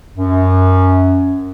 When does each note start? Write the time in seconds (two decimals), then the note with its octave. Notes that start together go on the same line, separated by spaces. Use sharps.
0.18 F#2